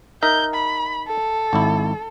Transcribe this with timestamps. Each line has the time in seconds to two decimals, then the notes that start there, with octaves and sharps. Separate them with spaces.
0.23 D#4 A#4 E5 G6
0.54 B5
1.08 A4
1.53 G#1 E4